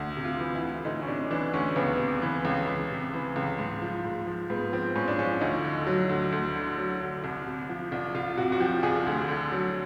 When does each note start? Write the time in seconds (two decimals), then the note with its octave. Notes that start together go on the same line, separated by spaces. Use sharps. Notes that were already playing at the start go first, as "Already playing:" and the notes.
Already playing: D2
0.17 C3
0.24 F4
0.39 E3
0.55 E4
0.62 D2
0.85 D2 D#4
1.02 C#4
1.08 C3 D4
1.31 E3 D4
1.53 D2 C#4
1.76 C#2 B3
1.99 C3
2.22 E3
2.45 C#2
2.67 C#2
2.90 C3
3.13 E3
3.36 C#2
3.59 G#2
3.82 F3
4.04 G#2
4.27 F3
4.50 G#2 B3
4.73 F3 C4
4.95 G#2 C#4
5.08 D4
5.18 F3 C#4
5.41 D2 D#4
5.64 D3
5.87 F#3
6.09 D2
6.32 D2
6.55 D3
6.78 F#3
7.01 D2
7.24 C2
7.46 C3
7.69 F3
7.92 C2
8.15 C2 F4
8.38 C3 F#4
8.52 F#4
8.60 F3 G4
8.83 C2 G#4
9.06 D2
9.28 D3
9.52 F#3